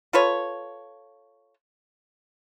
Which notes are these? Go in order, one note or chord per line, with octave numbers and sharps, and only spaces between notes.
F4 A4 B4 C#5